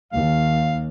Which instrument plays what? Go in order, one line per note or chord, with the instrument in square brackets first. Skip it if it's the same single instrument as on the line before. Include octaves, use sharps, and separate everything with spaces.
[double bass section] D#2 [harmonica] F5